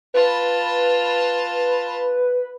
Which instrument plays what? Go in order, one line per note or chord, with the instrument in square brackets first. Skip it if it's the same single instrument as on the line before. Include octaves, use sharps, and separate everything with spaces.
[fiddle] F4 A5 [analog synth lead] B4